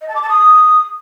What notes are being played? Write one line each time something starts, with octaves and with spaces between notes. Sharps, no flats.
D#5
A5
D6
A5
D#6